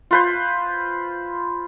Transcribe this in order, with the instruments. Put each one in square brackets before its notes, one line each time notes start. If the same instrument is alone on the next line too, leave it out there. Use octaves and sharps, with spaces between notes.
[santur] F4 B4 C5